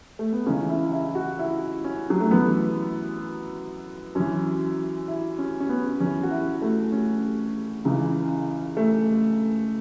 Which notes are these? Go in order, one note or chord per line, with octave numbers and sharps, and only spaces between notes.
A3
B3
C#2 C#3 E3 C#4
E4
E4
F#4
E4
C#4
F#3
A3
F#2 E3 B3
F#2 E3 C#4
E4
C#4
C#4
B3
E2 E3 C#4
F#4
E4
A3
C#4
C#2 C#3 E3
A3